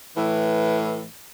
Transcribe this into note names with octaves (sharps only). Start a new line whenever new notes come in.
A2 E3